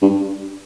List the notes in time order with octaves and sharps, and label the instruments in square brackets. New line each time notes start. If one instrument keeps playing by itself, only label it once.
[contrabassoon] G2